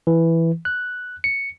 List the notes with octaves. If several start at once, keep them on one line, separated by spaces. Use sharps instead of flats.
E3
F#6
C#7